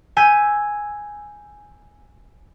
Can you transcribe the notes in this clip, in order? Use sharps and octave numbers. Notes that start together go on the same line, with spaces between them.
G#5 E6 G6 B6 D#7